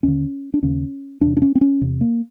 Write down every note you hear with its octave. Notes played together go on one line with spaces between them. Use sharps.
D#2 D3 C#4
D4
D#2 C#3 C#4
E2 C3 D4
D4
C#4
C4
C#4
E2 C3
A#3